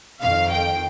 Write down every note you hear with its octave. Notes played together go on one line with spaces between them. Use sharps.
F2 D#3 F5
G5